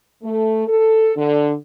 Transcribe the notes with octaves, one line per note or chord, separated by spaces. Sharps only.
A3
A4
D3